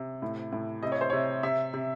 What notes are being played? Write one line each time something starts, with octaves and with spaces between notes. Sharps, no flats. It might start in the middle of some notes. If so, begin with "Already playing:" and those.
Already playing: C3
A2
A2
C3 D#5
C#5
C5
C3 C#5
C3 E5
C3